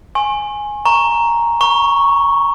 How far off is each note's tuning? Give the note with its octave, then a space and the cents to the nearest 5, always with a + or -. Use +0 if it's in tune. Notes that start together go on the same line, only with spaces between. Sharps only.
G#5 +0 C#6 -45
A#5 +0 C#6 -5
A#5 +45 C#6 +0